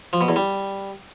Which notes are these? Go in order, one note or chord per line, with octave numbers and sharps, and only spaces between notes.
F3
B2
E2
G3